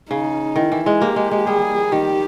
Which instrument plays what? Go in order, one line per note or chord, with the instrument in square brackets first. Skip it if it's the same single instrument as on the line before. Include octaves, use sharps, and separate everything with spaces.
[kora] C#3 [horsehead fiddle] D#4
[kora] D#3 [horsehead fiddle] E4
[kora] E3
G#3
[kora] A#3 [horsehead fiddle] G4
[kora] G#3
G#3
[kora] G3 [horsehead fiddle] G#4
[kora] D#3 [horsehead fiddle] G4